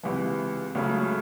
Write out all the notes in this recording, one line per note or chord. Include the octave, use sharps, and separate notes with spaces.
C#2 C3 E3
C#2 C#3 F#3 A3